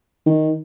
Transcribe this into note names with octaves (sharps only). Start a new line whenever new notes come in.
D#3